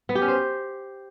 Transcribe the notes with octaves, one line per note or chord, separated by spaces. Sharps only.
B3
G4
C#4
C5